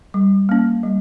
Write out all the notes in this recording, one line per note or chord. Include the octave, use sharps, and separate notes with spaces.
G3
A#3 C#4
G3